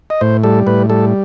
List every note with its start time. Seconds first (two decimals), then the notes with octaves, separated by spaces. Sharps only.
0.10 D#5
0.21 A2 C5
0.44 G3 A4
0.67 A2 B4
0.90 G3 A4